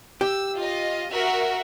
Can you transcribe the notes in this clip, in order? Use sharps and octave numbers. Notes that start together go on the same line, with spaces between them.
G4 E6
F4 D#5
F#4 A#4 E5